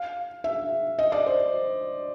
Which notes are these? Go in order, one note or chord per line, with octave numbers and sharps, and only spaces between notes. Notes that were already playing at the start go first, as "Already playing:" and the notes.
Already playing: F5
E5
D#5
D5
C5